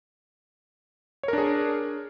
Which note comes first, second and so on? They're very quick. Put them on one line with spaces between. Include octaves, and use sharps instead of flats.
C#5 A#4 D4 G#4